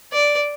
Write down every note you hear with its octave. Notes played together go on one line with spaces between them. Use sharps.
D5